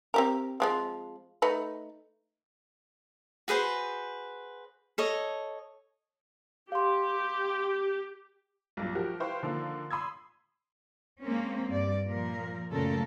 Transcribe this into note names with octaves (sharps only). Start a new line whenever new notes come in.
C4 G4 A#4
F3 G#3 C4
A3 D#4 B4
F#4 G#4 B4 C5
A4 C#5 D#5
G4 F5 C6
B1 G2 A#2
F3 F#4 G4 A#4
E4 B4 C5 F5 G5 C#6
D3 D#3 F3 A#3
B5 C6 D#6 E6 G#6
G#3 A#3 C4 C#4
G2 D5
A#2 F3 A#4
F#2 A#2 C#3 A3 A4 A#4